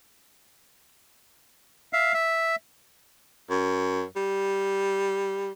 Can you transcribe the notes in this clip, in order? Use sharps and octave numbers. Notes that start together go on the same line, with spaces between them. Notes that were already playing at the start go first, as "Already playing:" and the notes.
E5 F5
E5
F#2
G3